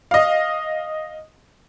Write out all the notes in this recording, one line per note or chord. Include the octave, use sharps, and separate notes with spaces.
D#5 F5